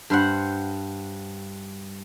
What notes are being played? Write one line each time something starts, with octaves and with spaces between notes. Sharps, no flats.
G2 C5 F#5